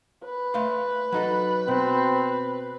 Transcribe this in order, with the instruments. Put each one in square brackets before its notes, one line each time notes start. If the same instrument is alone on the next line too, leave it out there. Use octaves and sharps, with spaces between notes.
[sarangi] B4
[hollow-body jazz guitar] A3 F5 C6
F#3 D#4 A4
[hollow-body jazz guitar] B2 [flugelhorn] C4